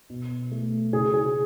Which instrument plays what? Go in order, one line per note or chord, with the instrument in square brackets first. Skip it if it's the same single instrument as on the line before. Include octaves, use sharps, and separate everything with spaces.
[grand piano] B2
A3
C#3 G#4
G#4